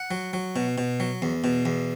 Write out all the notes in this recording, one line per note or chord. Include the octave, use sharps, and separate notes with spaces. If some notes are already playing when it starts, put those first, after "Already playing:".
Already playing: F#5
F#3
F#3
B2
B2
F#3
E2
B2
E2